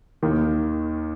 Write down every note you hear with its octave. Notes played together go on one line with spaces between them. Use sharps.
D#2 D#3